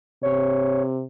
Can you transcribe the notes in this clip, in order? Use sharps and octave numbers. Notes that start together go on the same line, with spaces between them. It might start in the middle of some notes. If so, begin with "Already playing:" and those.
C3 C#5